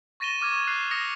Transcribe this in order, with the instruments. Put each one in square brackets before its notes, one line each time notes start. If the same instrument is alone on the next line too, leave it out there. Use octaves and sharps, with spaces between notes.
[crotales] C#6 A6 A#6 D#7 E7 G7
C#6 D6 F6 G#6
C#6 D#6 F6 G#6
F6 F#6 C7 F7
D#6 A#6 C#7 F7